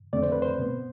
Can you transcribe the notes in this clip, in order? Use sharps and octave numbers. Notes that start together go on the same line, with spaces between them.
F2 D3 A3 C4 D5
C5
B4
C5
B2 B3